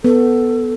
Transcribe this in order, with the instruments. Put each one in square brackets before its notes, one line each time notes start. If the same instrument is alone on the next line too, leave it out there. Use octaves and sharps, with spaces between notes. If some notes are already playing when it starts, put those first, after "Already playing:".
[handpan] B3 [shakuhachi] A4